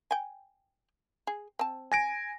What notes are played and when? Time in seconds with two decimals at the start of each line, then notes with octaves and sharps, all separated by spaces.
0.11 G5 G#5
1.27 G#4
1.59 C4 A5
1.92 G#5 A#6 D7